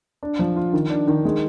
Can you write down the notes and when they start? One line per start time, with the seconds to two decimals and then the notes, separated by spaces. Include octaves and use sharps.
0.23 D4
0.39 F3
0.56 F4
0.73 D#3
0.90 D4
1.08 D#3
1.25 G#3